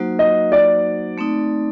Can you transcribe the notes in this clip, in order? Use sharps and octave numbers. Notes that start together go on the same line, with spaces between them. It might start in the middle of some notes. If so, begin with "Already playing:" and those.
Already playing: F#3 A#3 D#4 F#4 C5
D#5
D5
A3 C4 D#4